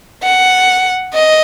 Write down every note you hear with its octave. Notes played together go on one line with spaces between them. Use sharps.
F#5
D#5